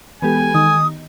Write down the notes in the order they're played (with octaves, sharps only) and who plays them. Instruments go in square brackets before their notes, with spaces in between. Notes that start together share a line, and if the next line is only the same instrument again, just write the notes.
[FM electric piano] E3 G#3 A4 [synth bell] B3 G4 [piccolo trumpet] G#5
[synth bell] D#3 [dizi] D#6